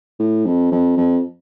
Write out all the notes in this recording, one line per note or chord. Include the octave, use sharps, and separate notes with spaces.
A2
F2
F2
F2